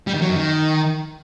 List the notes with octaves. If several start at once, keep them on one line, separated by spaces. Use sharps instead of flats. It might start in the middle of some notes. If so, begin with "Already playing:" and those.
G3
D#3
F#3
F#2
D#3